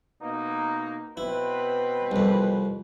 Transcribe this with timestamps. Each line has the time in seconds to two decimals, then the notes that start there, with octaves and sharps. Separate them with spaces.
0.21 B2 A#3 D#4
1.17 B2 C4 E4 B4
2.11 C2 F2